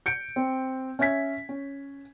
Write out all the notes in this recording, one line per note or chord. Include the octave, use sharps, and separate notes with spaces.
G6 C#7 D7
C4
C#4 E5 G#5 G#6 B6
C#4